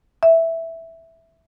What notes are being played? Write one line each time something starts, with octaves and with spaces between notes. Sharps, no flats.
E5